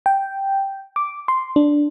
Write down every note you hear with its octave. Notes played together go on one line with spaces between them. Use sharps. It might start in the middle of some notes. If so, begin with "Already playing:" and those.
G5
D6
C6
D4